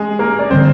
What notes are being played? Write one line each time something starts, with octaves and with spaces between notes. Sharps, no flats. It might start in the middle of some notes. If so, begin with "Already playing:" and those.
Already playing: G#3 G#4
A#3 A#4
D5
D3 G3 A#3 C4 C5